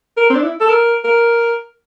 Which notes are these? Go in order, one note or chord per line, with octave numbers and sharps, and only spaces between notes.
A#4
C4
D4
E4
A4
A#4
A#4